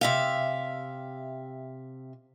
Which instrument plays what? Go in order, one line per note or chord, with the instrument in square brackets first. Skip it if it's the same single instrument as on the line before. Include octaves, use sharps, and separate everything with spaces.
[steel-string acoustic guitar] C3 E5 F5